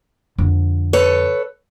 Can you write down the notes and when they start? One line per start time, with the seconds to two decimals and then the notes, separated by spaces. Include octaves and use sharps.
0.38 F2 D3
0.93 A4 B4 C#5